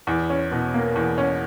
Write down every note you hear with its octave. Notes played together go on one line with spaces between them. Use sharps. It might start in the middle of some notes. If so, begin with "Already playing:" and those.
E2
C#4
B2
A#3
E2
C#4